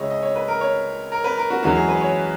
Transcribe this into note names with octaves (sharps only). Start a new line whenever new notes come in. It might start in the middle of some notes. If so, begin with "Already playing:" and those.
Already playing: C#2 C#3 G#3 C#5 D#5 E5
D#5
C#5
B4
A#4
C#5
A#4
B4
A#4
F#4
F#2 E3 G#3 F#4
G#4
B4
C#5